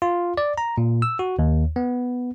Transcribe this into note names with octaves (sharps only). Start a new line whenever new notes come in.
F4
D5
A#5
A#2
E6
F#4
D#2
B3